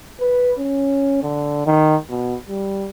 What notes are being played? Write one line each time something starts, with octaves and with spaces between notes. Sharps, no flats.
B4
C#4
D3
D#3
B2
G3